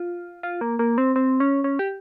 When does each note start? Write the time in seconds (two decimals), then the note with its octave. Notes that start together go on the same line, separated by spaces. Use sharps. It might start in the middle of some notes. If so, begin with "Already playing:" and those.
Already playing: F4
0.43 F4
0.61 A#3
0.79 A#3
0.98 C4
1.16 C4
1.40 C#4
1.64 C#4
1.79 G4